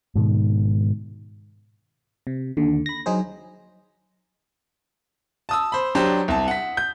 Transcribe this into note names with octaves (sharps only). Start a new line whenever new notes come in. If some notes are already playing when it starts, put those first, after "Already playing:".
G#2 B2 D#3
C3
D#2 D3
B5 A#6
F#3 D#4 G#4 C5
A5 D#6 E6
C5 B5
F#3 D4 G4 C5
C2 A5
F#5 B6
G6